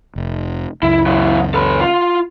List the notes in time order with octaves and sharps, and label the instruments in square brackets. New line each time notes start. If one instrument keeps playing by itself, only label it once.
[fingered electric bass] F1
[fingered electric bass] C#2 F#2 [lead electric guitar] E4
[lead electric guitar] F#3 E4
A4 B4
F4